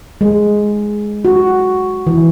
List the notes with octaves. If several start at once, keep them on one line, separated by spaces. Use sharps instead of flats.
G#3
F#4
E3